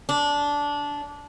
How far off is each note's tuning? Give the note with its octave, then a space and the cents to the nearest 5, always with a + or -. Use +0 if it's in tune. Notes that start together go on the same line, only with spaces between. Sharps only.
D4 -15